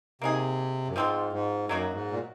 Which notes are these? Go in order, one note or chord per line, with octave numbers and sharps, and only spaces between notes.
C3 A#3 D#4 G#4
F#2
G#2 F3 G#3 C4 F4
G#2
F#2 F#3 A#3 D#4 F#4
G#2
A#2